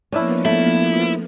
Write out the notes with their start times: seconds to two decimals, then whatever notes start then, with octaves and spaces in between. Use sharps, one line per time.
0.12 F3 A#3 B3 C#4 D4 E4
0.45 A3 E4